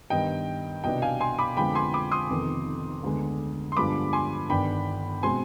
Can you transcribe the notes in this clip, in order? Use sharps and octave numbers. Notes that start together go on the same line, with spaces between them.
G2 D#3 B3 D#5 G5
C2 B2 B3 D4 D#5 G5
F5 G#5
G#5 C6
B5 D6
F2 D3 F3 G#3 B3 G5 B5
G#5 C6
B5 D6
C6 D#6
F1 F2 D#3 B3
D2 D3 G#3 B3
C6
G2 D3 F3 G#3 B3 B5 D6
G#5 C6
G1 G2 D#3 B3 D4 G5 B5
B2 G#3 C4 G#5 C6